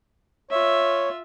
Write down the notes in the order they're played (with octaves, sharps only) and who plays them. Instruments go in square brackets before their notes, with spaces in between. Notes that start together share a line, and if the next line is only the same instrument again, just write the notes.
[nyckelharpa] F4 E5 [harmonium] C#5